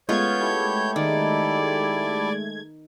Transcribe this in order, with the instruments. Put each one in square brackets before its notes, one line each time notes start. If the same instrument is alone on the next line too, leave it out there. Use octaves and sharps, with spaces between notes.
[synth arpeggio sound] G#3 A3 G#6 [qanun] B3 C#4 F4 [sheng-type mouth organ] C#5 G6
[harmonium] E4 G4 A4
[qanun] D#3 [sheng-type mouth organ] D5